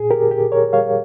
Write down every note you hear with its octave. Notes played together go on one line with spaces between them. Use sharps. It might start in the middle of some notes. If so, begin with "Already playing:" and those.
Already playing: A#2 G#4
G4 A#4
A#2 G4
A#4 C#5
G3 C#5 F5